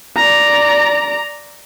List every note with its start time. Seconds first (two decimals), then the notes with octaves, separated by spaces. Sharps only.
0.16 D5 A#5